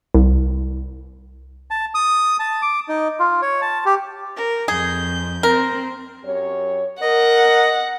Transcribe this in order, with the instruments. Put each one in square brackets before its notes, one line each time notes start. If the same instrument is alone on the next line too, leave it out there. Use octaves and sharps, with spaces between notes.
[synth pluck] C2
[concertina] A5
D#6
A5
D6
D#4
F4
C#5
A5
G4
[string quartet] A#4
[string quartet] F2 G6 [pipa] G#4
[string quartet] C4 [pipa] A#4
[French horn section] F#2 G4 C#5
[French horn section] A#4 [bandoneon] D#5 [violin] F#5